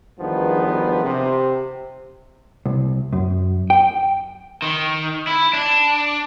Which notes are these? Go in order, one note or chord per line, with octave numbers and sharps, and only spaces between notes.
E2 G2 D#3 F3 B3
C3
C2
F#2
G5
D#3
E4
D4